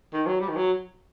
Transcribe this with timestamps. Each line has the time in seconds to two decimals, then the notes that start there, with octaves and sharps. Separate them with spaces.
0.13 D#3
0.27 F#3
0.40 G3
0.48 D#3
0.57 F#3